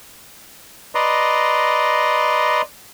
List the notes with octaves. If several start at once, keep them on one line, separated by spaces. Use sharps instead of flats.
B4 D5 D#5 A#5 C6